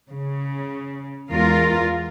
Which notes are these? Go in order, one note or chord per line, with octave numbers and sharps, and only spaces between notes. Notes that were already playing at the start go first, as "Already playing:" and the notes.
C#3
E2 G#3 F4 A#4